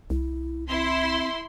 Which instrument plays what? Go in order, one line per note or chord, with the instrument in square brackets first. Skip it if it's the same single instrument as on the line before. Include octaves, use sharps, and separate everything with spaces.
[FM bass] C2 [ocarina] E4
[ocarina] C4 [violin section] E4 C6